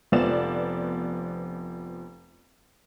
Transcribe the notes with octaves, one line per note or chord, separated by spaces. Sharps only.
F1 F3 B3 D5 E7